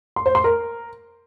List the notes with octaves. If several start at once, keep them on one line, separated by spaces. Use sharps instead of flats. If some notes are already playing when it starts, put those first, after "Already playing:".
C6
C5
C6
A#4